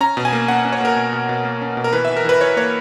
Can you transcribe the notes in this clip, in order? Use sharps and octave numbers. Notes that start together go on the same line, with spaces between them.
C#4 A#5
B2
G#5
A#3
C#4 F#5
C#4
C#5
A#3 A#4
B2
B2
B2
A#3
C#4
B2
A#4
E3 B4
E3 E5
A#4
E3 B4
E3 C#5
A#3 C#5